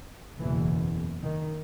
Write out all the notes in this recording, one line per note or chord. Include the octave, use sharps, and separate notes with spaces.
F#1 E2 B2 E3
D#3